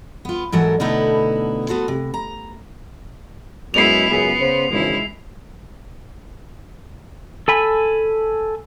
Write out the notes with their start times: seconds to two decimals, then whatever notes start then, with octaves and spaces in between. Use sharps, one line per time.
0.25 B3 F4
0.52 G#2 E3 F#3 A4 A#4 F#5
0.80 B2 D3 A3 B3 D#4 E4
1.68 B3 F#4 A4 C5
1.88 C3
2.14 A#5
3.74 F#2 G#3 B3 E4 C7 F7
4.09 C#2 F#2 B3 G#4
4.38 C#3 C5
4.70 G#1 E2 C#3 G#3 E4
7.48 A4 G#5 B5